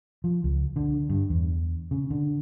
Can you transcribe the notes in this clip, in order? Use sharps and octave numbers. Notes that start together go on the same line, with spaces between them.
F3
C#2
D3
G2
E2
C#3
D3